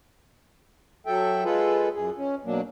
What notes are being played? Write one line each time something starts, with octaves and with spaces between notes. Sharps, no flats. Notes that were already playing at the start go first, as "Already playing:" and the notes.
F#3 A4 E5 G5
G#3 F4 G#4 A4 B4
F#2 G#4
C#4
B2 F#3 A#3 D4